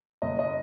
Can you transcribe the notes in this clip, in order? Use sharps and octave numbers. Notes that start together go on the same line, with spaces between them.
F#1 D#5
D#5